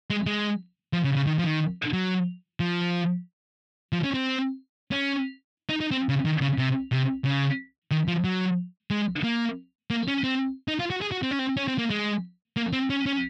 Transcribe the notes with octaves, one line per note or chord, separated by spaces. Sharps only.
G#3
G#3
F3
C#3
C#3
D#3
F3
D#3
F#3
F3
F3
C#4
C4
C#4
D#4
D#4
C4
C#3
D#3
C#3
C3
C3
C#3
D#3
F3
F#3
G#3
A#3
A#3
C#4
C4
D#4
F4
F#4
G#4
F#4
C4
C#4
C4
C#4
C4
A#3
G#3
A#3
C4
C#4
C#4